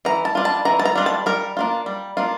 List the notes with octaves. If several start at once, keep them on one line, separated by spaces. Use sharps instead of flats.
E3 A#5
A5
G3 D4 F4
A5
E3 A#5
A5
A#5
G3 D4 F4
A5
G3 A#4
A#3 D4 F4
G3
A#3 D4 F4